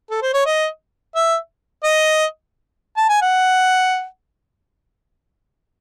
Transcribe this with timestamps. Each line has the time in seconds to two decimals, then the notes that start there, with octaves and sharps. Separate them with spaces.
0.10 A4
0.22 C5
0.34 C#5
0.46 D#5
1.15 E5
1.84 D#5
2.97 A5
3.09 G#5
3.22 F#5